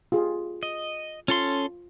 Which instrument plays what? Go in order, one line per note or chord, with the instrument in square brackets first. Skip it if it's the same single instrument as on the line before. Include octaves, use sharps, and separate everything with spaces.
[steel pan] F4 G4 G#4
[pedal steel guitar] D#5
[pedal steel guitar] C#4 A4 C6 [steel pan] F4